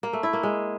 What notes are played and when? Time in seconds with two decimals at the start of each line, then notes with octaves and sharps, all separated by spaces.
0.03 A#3
0.13 A3
0.23 E4
0.33 A#3
0.43 G#3